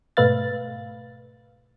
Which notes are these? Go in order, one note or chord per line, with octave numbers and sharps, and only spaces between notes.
G#2 B2 A3 B4 F5 A6